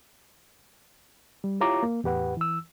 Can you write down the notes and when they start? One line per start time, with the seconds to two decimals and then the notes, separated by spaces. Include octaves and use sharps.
1.44 G3
1.60 E4 F4 G4 C#5 A#5 D6
1.83 A#3
2.04 E2 A2 G4 B4 F#5
2.37 E3 E6